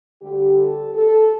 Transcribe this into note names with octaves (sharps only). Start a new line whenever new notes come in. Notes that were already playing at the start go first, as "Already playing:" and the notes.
D2 D3 G3 G4
A4
A4